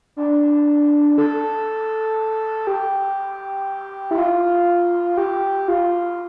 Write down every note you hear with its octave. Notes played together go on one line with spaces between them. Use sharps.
D4
A4
G4
E4
F4
G4
F4